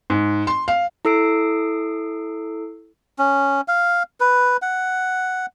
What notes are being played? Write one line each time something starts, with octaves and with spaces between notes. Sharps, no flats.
G#2
C6
F5
E4 A4 E6 C7 D7
C#4
F5
B4
F#5